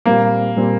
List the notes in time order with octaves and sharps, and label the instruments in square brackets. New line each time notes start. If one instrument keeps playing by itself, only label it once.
[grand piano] A#2 G3 C4 [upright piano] A#3
[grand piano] A#2 G3 C4